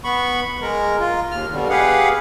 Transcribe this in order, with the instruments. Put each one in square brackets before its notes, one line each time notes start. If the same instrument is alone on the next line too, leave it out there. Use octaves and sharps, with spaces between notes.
[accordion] B3 B5 C#6
G#3 A#4
F4
D#2 F6
B2 D3 G3
G4 G#4 B4 F5 F#5